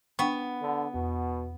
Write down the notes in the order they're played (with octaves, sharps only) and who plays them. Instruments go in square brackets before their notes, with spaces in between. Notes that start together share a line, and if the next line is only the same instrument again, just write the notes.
[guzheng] B3 [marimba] D4 G5 C#6
[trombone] D3
[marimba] E2 [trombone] B2